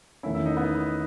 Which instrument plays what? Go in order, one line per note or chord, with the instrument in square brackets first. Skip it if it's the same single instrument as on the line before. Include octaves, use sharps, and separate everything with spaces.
[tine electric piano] E2 D#3 A3 C#4 [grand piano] E4
[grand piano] E4
D#4
B3